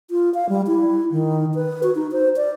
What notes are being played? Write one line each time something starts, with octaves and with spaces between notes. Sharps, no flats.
F4
F5
G3
E4
D#3
B4
F#4
D#4
C5
D5